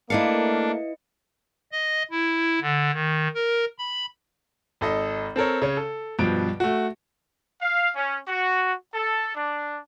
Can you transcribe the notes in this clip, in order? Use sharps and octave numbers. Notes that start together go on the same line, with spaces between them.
A3 A#3 D4 E4 B4 D#5 F5 C#7
D#5
E4
D3
D#3
A#4
B5
G#1 A4 D#5
C4 A4 A#4 C#5
C#3 C#5
A4
G2 B2 F3 D7
A3 F#4
F5
C#4
F#4
A4
D4